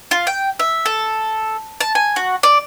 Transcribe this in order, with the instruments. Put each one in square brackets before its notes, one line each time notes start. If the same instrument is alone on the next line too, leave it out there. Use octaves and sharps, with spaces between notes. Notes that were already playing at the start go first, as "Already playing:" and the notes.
[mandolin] F4
G5
E5
A4
A5
G#5
F#4
D5